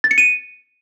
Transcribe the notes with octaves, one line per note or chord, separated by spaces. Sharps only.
A6
C#7
D#7